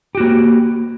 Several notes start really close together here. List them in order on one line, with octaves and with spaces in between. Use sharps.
G4 F#4 A#3